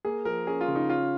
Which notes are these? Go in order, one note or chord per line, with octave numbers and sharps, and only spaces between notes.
A#3 G#4
F3 A#4
C#4 G#4
F4
C#3
D#4
C#4 F4